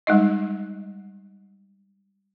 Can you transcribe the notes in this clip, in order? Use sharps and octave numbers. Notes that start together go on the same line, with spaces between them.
G3 G#3 D#4 D#5